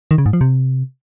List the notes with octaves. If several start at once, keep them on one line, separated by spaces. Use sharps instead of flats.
D#3
C#3
G#2
F3
C3